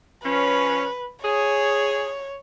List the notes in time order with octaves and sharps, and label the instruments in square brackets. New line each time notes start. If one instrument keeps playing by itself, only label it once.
[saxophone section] F3 C#4 [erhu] B4
[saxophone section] G#4 [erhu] C#5